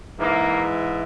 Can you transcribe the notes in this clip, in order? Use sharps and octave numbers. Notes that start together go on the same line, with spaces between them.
G#2 E3 A#3